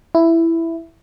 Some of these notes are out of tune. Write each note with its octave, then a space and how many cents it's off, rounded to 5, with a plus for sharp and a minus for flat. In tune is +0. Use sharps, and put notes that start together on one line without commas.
E4 +5